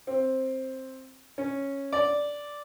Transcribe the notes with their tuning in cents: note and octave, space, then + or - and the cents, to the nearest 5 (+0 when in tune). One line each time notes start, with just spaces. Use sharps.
C4 +10
C#4 -5
D5 -5